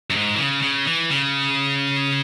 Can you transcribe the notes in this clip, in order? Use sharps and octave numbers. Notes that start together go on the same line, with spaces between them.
F#2
G#2
E3
C#3
C#3
E3
C#3